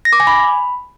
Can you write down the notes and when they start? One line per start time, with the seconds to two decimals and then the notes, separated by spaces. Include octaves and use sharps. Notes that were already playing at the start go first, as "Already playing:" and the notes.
0.05 A#6
0.13 D6
0.20 G#5
0.27 B5